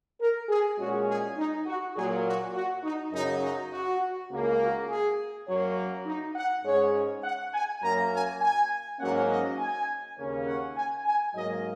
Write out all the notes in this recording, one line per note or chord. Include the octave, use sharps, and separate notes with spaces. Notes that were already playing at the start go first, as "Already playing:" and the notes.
A#4
G#4
A#2 G#3 C#4 F#4
G#4
D#4
F#4
A#2 F#3 A#3 G#4
F#4
F#4
D#4
F#2 C#3 F#3 D#4
D#4
F#4
C#2 C#3 A#3
F#4
G#4
F#2 F#3 A#3 C#5
D#4
F#5
G#2 G#3 C#4 C#5
F#5
G#5
F#2 F#3 A#3 A#5
G#5
G#5
G#2 F#3 A#3 C#4 F#5
D#5
G#5
D#2 C#3 A#3 C#4
F#5
G#5
G#5
G#2 F#3 A#3 D#5